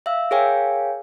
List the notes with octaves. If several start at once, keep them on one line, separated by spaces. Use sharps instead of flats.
E5 F5 E6
G#4 A#4 C#5 F5 G5 G#5